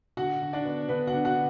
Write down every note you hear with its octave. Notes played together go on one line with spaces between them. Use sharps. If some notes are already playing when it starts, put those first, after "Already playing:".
D3 F#4 F#5
D3
D4 D5
B3
D3 B3 B4
F#4 F#5
D3
F#4 F#5